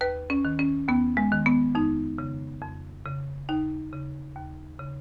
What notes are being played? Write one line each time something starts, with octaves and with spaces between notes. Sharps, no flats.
D#2 B4
C#4
D#3
C#4
D#2 B3
G#3
D#3
B3
F2 D#4
C#3
F2
C#3
D#2 D#4
C#3
D#2
C#3